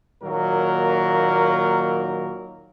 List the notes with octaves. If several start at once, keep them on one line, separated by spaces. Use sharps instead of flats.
A#2 D#3 F#3 A#3 A#4